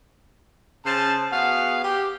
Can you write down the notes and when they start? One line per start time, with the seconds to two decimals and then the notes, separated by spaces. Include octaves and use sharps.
0.85 C#3 C5 A5
1.31 B3 F#4 G#4 F5
1.83 G4